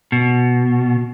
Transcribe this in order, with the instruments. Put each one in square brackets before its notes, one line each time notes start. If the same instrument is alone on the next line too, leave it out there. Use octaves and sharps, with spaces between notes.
[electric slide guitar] B2